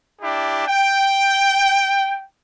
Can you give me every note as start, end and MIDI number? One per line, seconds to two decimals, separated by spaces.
0.22 0.65 62
0.22 0.65 64
0.22 0.65 67
0.67 2.23 79